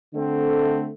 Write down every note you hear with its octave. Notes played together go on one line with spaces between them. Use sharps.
D3 A3 C4